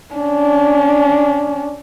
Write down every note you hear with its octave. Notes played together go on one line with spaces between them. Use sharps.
C#4 D4